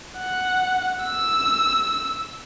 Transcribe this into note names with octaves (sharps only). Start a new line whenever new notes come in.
F#5
E6